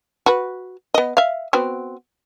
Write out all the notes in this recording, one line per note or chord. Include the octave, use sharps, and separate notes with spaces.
F#4 B4
B3 D#5
E5 F5
B3 C4 F#4